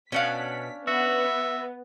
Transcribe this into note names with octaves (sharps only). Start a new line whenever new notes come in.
B2 C#4 D4 F5 F#5 B6
B3 F#4 E5